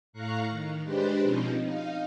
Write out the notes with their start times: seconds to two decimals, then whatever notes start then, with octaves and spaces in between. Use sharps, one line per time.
0.13 A2 F5 A#5 C#6 F#6
0.50 D#3
0.82 G#3 D4 G4 B4 C5
1.22 B2 F3 C4 C#4 D#4
1.63 D#4 F5